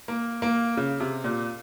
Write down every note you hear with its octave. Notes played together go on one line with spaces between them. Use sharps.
A#3
A#3
C#3
C3
A#2